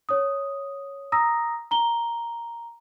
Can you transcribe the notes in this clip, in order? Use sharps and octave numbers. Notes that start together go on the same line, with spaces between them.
C#5 D#6
A#5 D#6 E6 A#6
A#5 G7